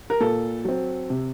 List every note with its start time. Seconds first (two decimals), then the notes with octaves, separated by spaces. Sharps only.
0.10 A#4
0.21 A#2 A4
0.65 F#3 C4
1.10 C3